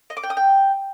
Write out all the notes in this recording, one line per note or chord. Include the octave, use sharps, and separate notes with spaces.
D#5
D6
G5
D#6
G5